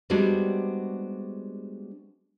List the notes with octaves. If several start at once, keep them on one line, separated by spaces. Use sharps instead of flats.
G3 G#3 B3 C4 D4 F#4